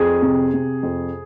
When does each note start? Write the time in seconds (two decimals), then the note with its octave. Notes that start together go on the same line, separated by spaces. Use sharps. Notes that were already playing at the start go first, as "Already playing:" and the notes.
Already playing: F2 G#4
0.22 C3
0.54 C3
0.83 F2